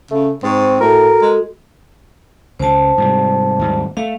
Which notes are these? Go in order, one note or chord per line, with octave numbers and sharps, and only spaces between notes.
C#3 A3
G#2 C4 D#4 C5 C#6
A2 F#4 A4 A#4
G#3
C#2 C#3 C5 A5
G#2 C3 G3
D#2 G#2 G3
A3 F5